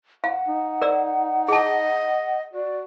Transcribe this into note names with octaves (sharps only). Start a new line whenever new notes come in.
F5 F#5
D#4
A#4 D5 E6
G#4 D#5 A5
F#4 D5